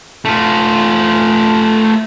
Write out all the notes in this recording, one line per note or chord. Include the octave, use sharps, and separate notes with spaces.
A3 F4